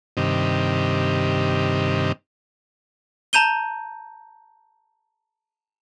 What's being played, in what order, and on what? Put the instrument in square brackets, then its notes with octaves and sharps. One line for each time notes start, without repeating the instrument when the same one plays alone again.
[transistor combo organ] G2 C3 D#3
[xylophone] A5 A#5 G6 D#7 G7